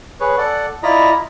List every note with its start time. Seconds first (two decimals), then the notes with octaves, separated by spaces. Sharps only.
0.21 G#4 B4 C#5
0.38 A4 D5 F#5
0.83 E4 F4 D5 D#5 A#5 B5